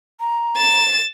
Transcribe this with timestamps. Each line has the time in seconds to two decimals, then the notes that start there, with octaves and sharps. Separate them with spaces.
0.20 A#5
0.56 A6 E7